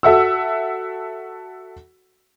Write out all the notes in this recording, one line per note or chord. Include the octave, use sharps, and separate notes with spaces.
F#4 A4 E5 F#5 E6